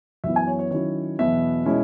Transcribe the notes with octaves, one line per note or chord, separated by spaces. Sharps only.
F#2 E3 B3 E5
G#5
C#5
C#5
D#3 F#3 C#4 E4 C#5
E2 B2 F#3 B3 E5
B2 G#3 C#4 E4